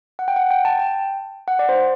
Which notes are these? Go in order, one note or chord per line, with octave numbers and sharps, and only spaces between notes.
F#5
G5
F#5
G5
A5
G5
F#5
D5
C5